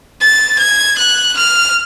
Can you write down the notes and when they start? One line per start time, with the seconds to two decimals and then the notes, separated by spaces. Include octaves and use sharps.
0.21 A6
0.59 G#6
0.98 F#6
1.37 F6